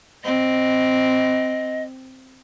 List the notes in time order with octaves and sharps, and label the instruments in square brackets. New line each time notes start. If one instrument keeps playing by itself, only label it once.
[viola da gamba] C4 [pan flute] D#5